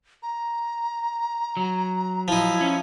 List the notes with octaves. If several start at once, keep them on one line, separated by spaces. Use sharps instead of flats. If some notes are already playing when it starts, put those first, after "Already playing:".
A#5
F#3
F3 D#4 E4
C#4